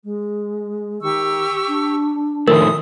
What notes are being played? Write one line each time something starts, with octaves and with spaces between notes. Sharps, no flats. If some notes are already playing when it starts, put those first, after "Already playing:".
G#3
D#3 G4 C#6 E6
D4
D#3 F3 A3 A#4 D#6